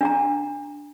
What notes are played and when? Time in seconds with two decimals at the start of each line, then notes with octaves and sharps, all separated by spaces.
0.01 D4 F#5 A#5